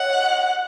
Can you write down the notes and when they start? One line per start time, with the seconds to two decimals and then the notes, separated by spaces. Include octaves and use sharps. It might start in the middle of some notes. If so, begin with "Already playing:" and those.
Already playing: C#5 D#5 F#5